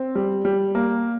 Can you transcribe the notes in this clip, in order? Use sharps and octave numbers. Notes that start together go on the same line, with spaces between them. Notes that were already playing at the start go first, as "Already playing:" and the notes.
Already playing: C4
G3
G3
A#3